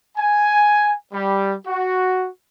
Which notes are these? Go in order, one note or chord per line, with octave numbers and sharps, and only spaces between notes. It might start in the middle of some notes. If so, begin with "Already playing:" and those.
G#5
G3
F#4